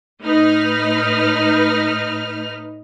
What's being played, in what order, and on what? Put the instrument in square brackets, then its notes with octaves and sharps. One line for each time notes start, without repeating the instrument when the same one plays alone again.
[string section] A2 D#4 B4 D#5 F6